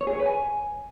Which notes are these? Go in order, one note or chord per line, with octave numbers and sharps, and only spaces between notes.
C#5
G#4
C#5
B4
G#5